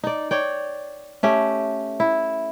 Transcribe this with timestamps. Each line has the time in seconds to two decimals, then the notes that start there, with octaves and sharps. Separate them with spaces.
0.04 D#4 D5
0.31 C#5 D5 G5
1.23 A3 C#4 G4
2.00 E4